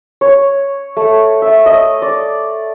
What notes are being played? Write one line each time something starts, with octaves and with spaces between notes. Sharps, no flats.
C#5
A3
E5
D#5
D5